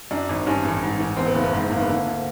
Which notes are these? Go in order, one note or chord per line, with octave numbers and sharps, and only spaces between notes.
F#2 D4
G#1
G2 C#4
A1
G#2
A1
E2 C4
B3
F#1 A#3
B3
G#2 C4
G#1 A#3
B3
D3 A#3
D2